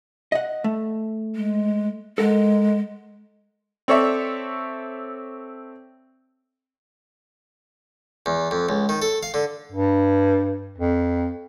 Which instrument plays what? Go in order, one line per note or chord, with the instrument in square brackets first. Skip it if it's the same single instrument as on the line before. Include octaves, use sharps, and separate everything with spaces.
[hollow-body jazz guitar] D#5 F#5
A3
[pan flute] G#3
[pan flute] G#3 [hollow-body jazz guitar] A4 A#4 F#5
[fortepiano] C4 A4 C#5 D5 E5
[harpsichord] E2
F2
C#2
D#3
A4
F5
D3
[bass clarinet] G2
F2